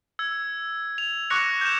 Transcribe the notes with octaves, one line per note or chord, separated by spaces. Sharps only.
E6 G#6
F7
C#6 D6 F#6 A#6 C#7 F7
G6 E7